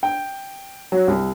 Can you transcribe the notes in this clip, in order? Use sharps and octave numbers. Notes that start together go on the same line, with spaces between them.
G5
F#3
C2